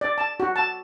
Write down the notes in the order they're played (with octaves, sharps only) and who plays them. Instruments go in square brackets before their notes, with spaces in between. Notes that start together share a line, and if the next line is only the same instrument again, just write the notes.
[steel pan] D5
A5
F#4
A5